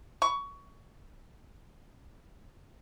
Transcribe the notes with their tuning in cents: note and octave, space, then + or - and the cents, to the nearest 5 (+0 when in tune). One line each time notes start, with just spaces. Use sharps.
C#6 +20